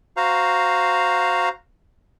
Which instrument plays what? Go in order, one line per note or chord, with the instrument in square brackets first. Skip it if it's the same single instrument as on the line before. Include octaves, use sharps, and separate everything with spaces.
[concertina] F#4 C5 F5 A#5